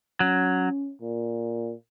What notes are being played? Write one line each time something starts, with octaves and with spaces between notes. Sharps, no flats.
F#3 C#4
A#2